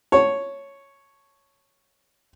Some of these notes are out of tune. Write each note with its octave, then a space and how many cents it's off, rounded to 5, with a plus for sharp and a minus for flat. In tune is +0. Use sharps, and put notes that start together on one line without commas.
C#5 +0 A5 +0 C#6 +0